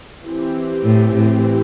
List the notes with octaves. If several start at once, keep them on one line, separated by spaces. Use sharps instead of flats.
E3 C4 G4
A2
A2